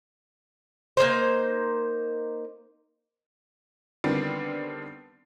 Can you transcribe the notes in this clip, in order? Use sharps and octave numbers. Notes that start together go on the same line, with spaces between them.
A#3 C#4 D#4 C5
D3 D#3 G3 B3 C4 D4